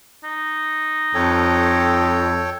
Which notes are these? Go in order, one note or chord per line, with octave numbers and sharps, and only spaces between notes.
D#4
F2 A4 C#5 G5